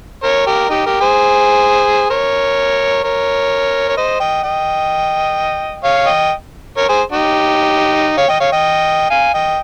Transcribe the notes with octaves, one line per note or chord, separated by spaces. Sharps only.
A#4 C#5
G4 A#4
D#4 G4
G4 A#4
G#4 C5
A#4 C#5
A#4 C#5
C#5
C5 D#5
D#5 G5
D#5 G5
C#5 F5
D#5 G5
A#4 C#5
G#4 C5
D#4 G4
C#5 F5
D#5 G5
C#5 F5
D#5 G5
F5 G#5
D#5 G5